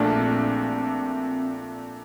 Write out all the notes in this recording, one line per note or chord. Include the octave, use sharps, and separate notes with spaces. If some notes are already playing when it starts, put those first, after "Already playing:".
Already playing: A#1 A#2 A3 D4
C4
C4